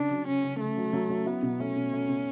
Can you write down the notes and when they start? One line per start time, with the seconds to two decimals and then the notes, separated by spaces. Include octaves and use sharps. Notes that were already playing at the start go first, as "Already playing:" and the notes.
Already playing: C#3 D4
0.11 F#3
0.27 C#3 C#4
0.44 C#3
0.60 C#3 A3
0.77 F#3
0.93 F#3
1.10 F#3
1.26 B3 E4
1.43 B2
1.60 A3 C#4
1.77 B2
1.93 A3
2.09 B2